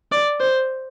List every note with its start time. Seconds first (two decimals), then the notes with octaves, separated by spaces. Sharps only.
0.12 D5
0.40 C5